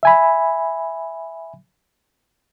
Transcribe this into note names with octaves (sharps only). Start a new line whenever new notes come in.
E5 G#5 B5